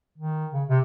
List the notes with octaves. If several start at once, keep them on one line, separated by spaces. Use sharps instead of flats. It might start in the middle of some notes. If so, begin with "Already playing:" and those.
D#3
C#3
C3